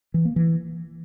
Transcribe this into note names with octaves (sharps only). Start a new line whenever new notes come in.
E3
A#3
E3